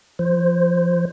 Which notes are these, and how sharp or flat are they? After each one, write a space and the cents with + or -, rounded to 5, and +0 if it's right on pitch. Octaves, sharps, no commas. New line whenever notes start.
F3 -10 C5 +0